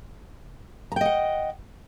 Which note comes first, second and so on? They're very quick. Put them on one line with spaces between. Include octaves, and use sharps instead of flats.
A#5 G5 D#5 F#5